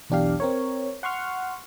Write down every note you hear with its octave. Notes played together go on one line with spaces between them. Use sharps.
B1 E2 D4 G4 F5
C4 A#4 C#5
F#5 C6 C#6 F6